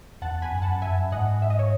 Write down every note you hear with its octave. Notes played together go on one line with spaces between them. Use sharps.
E2 F#5 A5
G#5 B5
F#2
F#5 A5
F#2 E5 G#5
G#2 D#5 F#5
E5
D#5
C#5